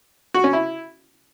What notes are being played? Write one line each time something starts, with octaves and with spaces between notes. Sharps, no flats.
F#4
C#4
E4